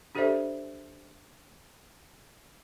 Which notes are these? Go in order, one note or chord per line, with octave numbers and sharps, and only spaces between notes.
D4 G4 A4 C5 D5 E5